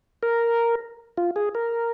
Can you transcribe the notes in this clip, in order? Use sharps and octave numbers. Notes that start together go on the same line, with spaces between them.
A#4
F4
G#4
A#4